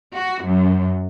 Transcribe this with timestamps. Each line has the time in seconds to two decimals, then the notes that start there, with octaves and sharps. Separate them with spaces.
0.15 F#4
0.44 F#2